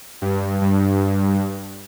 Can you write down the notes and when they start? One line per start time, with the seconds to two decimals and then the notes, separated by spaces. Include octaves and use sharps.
0.22 G2
0.61 G2